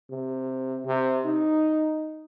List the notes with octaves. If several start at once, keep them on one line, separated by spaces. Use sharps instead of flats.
C3
C3
D#4